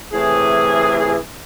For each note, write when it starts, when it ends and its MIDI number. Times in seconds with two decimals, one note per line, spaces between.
0.13 1.16 45
0.13 1.16 48
0.13 1.16 52
0.13 1.16 68